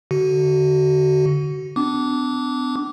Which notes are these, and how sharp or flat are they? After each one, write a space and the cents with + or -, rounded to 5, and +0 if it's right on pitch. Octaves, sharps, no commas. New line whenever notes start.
D3 -5 F#4 +25
B3 +45 D4 +0 D6 -20